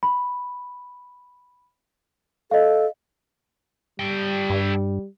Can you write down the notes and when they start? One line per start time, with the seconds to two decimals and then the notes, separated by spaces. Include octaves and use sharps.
0.03 B5
2.51 A4 D#5 F5
4.00 G3 A4 G5
4.50 G2